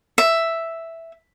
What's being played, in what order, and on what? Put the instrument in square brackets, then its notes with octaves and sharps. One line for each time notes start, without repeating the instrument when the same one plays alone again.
[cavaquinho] E5